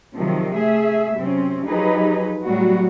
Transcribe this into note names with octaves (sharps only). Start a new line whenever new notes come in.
C3 D#3 F3 F#3
A3 G#4 E5
F#2 C3 C4 C#4
F3 F#3 D#4 G4 G#4 B4
A2 F#3 G3 B3 F#4